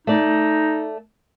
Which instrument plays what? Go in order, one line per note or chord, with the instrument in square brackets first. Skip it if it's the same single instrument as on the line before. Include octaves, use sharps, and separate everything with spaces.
[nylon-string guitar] A3 D5 [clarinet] D#4